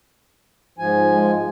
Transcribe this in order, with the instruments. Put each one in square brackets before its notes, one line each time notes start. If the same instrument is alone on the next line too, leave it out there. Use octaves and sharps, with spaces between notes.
[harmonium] G#2 F3 G#5
[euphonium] G#3